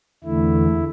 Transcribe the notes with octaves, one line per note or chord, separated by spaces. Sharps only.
E2 D3 A3 E4